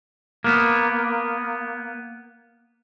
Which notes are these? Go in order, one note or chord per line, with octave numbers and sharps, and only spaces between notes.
A#3 B3